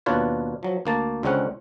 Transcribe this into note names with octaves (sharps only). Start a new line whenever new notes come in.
D#2 B2 D4 F4 B4 C#5
F3 F#3
D2 A#3 A5
C#2 D3 G#3 C4 C#4 F#5